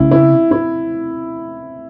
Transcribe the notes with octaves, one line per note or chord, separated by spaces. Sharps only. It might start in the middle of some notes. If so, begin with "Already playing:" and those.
Already playing: C#3 E4
E4
E4